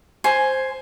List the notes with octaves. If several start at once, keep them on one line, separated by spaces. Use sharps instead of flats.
C5 G#5